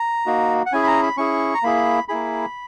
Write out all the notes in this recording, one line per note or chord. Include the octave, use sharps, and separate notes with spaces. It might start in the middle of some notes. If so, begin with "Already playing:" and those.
Already playing: A#5
A#3 D#4 F#4
F#5
C#4 E4 G#4 G#5
B5
A#5
B5
C#4 E4 G#4 C#6
A#5
A#3 E4 G#4 B5
A#3 E4 G#4 B5